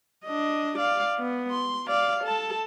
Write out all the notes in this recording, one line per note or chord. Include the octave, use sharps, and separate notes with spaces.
D4 D#5
D5 F5
B3
C6
D5 F5
A4 A5